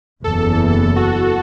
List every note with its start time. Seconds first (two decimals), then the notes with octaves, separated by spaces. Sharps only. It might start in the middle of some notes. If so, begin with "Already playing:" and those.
0.23 F#1 E2 E3 A4
0.49 A4
0.73 A4
0.96 F#4